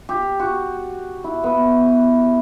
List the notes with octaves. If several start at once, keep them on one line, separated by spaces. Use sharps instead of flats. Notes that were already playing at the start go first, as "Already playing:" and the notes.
G4
F#4
E4
B3